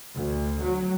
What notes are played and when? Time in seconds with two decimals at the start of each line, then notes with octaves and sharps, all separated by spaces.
0.15 D2
0.63 F#3